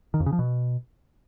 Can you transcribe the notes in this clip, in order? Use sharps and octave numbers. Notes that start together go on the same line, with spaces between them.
D#3
F2
C#3
F3
B2